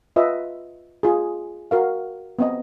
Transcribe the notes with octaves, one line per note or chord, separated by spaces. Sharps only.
F4 B4 D#5 E5
F4 G#4
F#4 A#4 F5
B3 C4 D#5